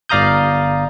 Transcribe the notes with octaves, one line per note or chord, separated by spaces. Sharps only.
G1 D5 F5 A#5 D#6 G6